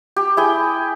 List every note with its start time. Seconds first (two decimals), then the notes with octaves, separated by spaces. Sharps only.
0.16 G4
0.37 E4 G#4 G5